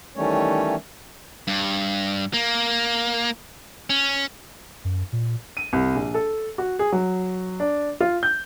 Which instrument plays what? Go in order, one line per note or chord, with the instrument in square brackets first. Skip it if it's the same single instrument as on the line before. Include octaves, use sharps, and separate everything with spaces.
[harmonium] D#3 E3 G3 A3 C#4 C#5
[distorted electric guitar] G2
A#3
C#4
[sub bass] F#2
A#2
[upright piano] D#7
C2
A#1
A4
F#4
G#4
F#3
D4
F4
G6